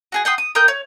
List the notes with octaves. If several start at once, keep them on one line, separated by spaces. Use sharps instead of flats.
F#4 G#4 G#5
F#5 G5 C6 D#6
D#6
A#4 G5 D#6 G6
C#5